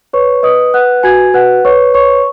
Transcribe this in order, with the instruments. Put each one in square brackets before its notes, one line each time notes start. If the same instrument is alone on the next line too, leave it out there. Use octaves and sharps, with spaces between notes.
[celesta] B4 C#5 C#6
B4 D#5 D#6
B4 F#5 F#6
F#4 G#5 G#6
B4 F#5 F#6
B4 C#5 C#6
C#5 C#6